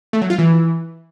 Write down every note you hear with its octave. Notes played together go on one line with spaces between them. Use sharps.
A3
F#3
F4
E3